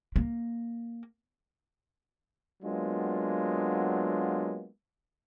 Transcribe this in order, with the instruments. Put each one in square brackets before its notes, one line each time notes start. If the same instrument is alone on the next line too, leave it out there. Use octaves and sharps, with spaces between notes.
[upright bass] A#3
[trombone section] F#3 G#3 A#3 B3 D4 F4